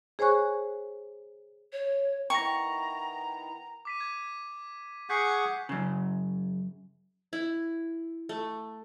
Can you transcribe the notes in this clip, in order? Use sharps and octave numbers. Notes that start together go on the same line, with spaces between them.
G#4 C5 C#5 G#5 C#6 F#6
C#5
D#3 B3 E4 G5 A#5 C#6 A#6
D6 B6 D#7
G#6
G#4 F#5 C#6 G6 B6 C7
F#2 C#3
E4
A3